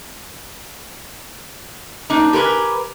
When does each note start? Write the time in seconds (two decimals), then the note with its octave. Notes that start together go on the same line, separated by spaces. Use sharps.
2.10 A#3 D4 D#4
2.33 G4 A#4 B4 G#5